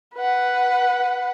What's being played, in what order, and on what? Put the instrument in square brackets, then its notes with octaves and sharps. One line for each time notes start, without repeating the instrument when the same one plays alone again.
[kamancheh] B4 F#5